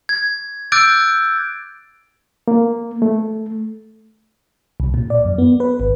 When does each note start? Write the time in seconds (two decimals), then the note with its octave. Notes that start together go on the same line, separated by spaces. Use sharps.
0.09 G#6
0.72 D6 E6 F#6 G6 A6 D7
2.48 A#3
3.02 A3
4.80 C2
4.94 A#2
5.10 D5
5.25 F#2
5.38 B3
5.60 B4
5.80 G#1